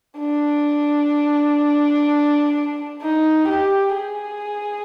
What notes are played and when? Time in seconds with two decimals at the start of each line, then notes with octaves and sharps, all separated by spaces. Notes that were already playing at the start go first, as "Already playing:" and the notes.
0.19 D4
3.02 D#4
3.49 G4
3.95 G#4